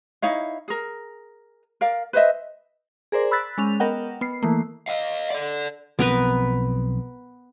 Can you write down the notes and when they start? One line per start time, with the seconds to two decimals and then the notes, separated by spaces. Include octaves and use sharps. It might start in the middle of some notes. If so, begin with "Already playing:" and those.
0.22 D#4 E4 C#5 F5
0.68 G#4 A#4
1.81 A#4 D5 F5
2.13 B4 C5 D#5 E5
3.12 G#4 A#4 C5 D5
3.31 B5 E6 F#6 A6 B6
3.58 G#3 C#4 F7
3.80 B3 A#4 D#5 F#5 G5
4.21 B3 C7
4.43 E3 A3 A#3
4.88 D#5 F5
5.30 A4 D5
5.99 B1 F3 B3 C4 A#4 B4